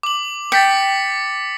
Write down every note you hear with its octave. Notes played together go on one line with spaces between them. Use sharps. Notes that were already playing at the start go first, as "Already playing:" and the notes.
D6 F#7
G5 A6 B6 C#7